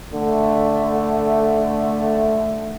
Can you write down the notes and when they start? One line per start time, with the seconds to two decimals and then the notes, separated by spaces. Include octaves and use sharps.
0.14 D3 A3